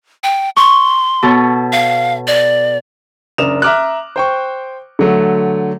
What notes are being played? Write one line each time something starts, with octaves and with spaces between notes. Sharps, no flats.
G5
C6 C#6
B2 A4 C#5
F5
D5
F#1 D4 A#4 D#6 E7 F7
E5 A#5 D6 F6 F#6
C5 G5 C#6
D3 F#3 A3